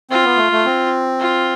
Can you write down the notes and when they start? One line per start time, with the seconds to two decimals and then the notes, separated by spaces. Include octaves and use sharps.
0.10 C4 F4
0.25 B3
0.37 A3
0.52 A3
0.65 C4
1.20 F4